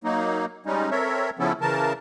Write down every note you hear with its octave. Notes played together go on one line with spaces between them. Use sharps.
F#3 A#3 D#4
G3 G#3 C#4 D#4
C4 A4 A#4 C#5 E5
C#3 F3 B3 C#4 E4 A4
C#3 E3 A#4 A5